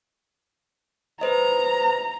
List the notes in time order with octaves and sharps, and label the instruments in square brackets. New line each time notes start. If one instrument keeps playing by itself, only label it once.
[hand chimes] B4 C5 D#5 [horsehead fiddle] A#5